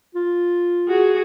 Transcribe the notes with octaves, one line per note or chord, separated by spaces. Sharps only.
F4
F#4 G#4